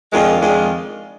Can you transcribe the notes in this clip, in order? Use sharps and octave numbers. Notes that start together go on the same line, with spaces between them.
F2 D#3 G#3 D4 F4
F2 D#3 G#3 D4 F4